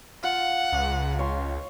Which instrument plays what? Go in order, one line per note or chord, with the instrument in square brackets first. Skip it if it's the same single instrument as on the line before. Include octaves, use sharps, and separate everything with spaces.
[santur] F4 [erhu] F#5
[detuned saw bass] C#2
[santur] C#5 C6